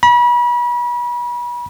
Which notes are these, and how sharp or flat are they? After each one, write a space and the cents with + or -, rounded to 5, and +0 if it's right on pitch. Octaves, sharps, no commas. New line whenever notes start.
B5 -35